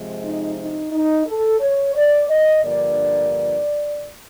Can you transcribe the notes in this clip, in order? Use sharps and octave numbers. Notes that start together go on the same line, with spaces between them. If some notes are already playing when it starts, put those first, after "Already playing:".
Already playing: C3 F3 G#3
D#4
D#4
D#4
A4
C#5
D5
D#5
G2 D3 F3 A#3 D5